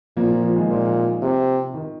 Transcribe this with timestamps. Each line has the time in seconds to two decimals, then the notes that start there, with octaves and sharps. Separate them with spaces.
0.17 A#2 F3 A#3
0.30 F3
0.43 F3
0.56 D#3 G#3
0.69 A#2 F3
1.22 C3
1.74 D#3